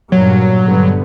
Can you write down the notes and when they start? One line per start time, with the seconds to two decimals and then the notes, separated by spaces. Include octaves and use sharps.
0.12 G2 A#2 F#3
0.64 G2 D3 B3